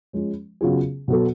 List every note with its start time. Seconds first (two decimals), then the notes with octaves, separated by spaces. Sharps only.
0.13 F3 G#3 C#4
0.61 C#3 F#3 B3 F4 G#4
1.08 B2 F#3 B3 F#4 A4